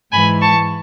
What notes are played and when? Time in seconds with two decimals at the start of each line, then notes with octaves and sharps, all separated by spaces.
0.11 G#2 E3 G#5 B5
0.40 A5 C#6